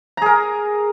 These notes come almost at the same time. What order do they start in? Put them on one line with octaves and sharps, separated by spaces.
A#5 G#4 A#4